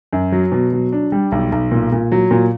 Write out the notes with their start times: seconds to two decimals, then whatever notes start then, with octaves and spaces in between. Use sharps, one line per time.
0.13 F#2
0.32 F#3
0.52 B2
0.73 F#3
0.92 D4
1.12 G3
1.32 B1
1.52 B1
1.72 A#2
1.92 A#2
2.12 F#3
2.31 A#2